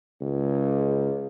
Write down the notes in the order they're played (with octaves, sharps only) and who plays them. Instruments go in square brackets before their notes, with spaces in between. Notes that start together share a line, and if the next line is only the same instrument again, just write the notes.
[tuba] C#2